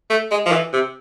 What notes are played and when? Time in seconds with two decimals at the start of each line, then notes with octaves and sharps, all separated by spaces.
0.10 A3
0.31 G#3
0.46 F3
0.52 E3
0.73 C3